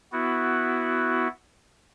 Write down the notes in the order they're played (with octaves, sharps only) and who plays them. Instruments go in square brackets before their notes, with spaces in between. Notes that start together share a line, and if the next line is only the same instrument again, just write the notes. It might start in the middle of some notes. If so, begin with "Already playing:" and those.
[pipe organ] B3 E4 F#4